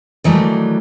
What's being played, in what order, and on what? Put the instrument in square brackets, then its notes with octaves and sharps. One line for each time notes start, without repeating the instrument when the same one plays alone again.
[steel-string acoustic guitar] D#3 E3 F#3 G3 A3